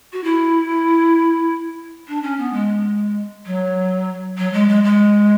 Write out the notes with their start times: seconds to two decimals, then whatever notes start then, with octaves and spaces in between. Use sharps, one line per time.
0.13 F#4
0.24 E4
2.08 D4
2.23 C#4
2.39 B3
2.53 G#3
3.46 F#3
4.38 F#3
4.53 G#3
4.68 G#3
4.84 G#3